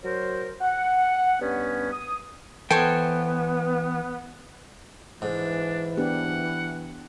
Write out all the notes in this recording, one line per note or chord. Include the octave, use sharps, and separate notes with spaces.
F#3 A#4 C5
F#5
G2 B3 C#4
D#6
E3 B3 A4 C5 C#5 G5
G#2 E3 D4
B3 D4 G4 F#5